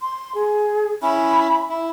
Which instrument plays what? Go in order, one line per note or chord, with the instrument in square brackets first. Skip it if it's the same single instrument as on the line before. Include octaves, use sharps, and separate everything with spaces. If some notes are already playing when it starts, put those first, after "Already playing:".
[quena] C6
G#4
[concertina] C#4 E4 [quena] B5
[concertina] E4